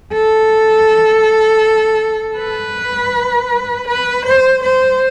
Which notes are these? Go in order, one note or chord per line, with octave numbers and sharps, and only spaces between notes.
A4
B4
B4
C5
C5